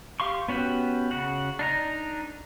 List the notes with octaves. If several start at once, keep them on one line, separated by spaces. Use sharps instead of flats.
G4 F5 C6 C#6
B3 C#4 F#4 G4 B4
C#3 F#4 F#5
D4 D#4 A#5